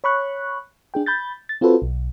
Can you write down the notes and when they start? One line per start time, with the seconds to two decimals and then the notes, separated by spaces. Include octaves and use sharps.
0.04 C#5 B5 C#6 F#6
0.94 D4 G#4 G5
1.06 B5 G6 A6
1.49 A6
1.61 C4 F4 F#4 A4 B4 C5
1.82 B1